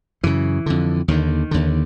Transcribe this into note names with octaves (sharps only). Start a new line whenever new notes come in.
F#2 C#3 E3
F2 D3
D#2 D3 D#3
D#2 D3